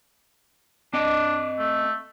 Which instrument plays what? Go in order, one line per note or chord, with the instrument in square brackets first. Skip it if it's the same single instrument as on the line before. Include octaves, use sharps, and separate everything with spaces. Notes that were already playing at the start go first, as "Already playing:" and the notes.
[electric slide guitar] C4 D#5 [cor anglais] D4
[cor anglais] A3